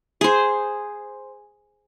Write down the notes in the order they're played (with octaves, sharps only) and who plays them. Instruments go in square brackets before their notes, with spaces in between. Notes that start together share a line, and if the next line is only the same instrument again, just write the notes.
[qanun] G#4 C5